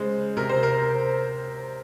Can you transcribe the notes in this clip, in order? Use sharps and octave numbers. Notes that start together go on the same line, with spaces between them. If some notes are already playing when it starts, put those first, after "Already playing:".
Already playing: C#3 G#3 C5
C3 A#4
C5
A#4